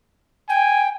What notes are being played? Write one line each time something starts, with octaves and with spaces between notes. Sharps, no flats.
G5 G#5